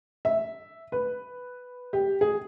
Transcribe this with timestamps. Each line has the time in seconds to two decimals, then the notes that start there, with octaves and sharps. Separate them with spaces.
0.25 E5
0.92 B4
1.93 G4
2.21 G#4